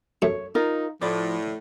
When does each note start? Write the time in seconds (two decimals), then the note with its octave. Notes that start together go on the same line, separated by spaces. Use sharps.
0.22 F#2 A3 C#5
0.55 D#4 F4 A#4
1.01 A2 F3 D5